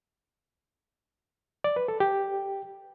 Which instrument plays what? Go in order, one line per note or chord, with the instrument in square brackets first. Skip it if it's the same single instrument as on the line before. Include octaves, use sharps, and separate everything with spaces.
[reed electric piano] D5
B4
A4
G4